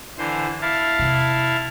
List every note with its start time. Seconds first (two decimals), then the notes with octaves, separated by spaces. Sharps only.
0.18 D3 E3 C5
0.62 E4 F5 A5
0.99 E2 C3